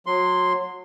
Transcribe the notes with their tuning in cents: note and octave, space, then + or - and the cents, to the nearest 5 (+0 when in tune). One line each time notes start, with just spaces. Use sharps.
F#3 -25 C6 +0